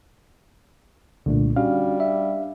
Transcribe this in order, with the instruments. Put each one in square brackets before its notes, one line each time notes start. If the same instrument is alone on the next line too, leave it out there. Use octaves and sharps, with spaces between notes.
[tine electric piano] C2 A#2 [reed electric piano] D3 A3 D4
[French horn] G3 [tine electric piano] C#4 F#4 [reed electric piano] D4 F5
[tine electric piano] E5